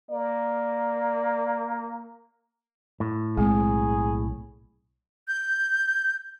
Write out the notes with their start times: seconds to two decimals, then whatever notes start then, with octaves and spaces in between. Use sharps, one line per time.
0.11 A#3 D5
3.00 A2
3.37 B1 G#3 C4 G#4
5.28 G6